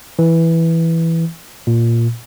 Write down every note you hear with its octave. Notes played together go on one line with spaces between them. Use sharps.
E3
A#2